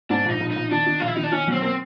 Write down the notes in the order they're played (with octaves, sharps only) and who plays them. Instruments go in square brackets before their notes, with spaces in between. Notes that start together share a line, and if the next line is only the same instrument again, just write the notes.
[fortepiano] G#2 [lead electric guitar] D4
[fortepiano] A#1 [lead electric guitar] D#4
[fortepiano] A#1
[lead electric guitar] D#4
[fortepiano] A#1
[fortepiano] D#3 [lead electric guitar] D4
[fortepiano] D#3
[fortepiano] A#1 [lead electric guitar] F4
[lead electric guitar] E4
[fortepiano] D#3 [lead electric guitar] D#4
[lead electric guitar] D4
[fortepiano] D#3 [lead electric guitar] C#4
[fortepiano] F#3 [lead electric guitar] C4
[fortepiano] A#3 [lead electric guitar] C4